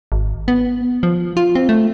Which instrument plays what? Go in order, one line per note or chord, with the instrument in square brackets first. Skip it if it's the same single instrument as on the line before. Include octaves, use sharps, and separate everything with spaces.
[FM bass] G#1
B3
F3
F4
C4
A3